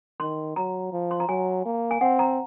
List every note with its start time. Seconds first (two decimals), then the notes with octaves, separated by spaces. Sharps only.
0.20 D#3 C6
0.56 F#3 A#5
0.93 F3
1.11 C6
1.20 A#5
1.29 F#3 G#5
1.65 A#3
1.91 G#5
2.01 C4 F#5
2.19 A#5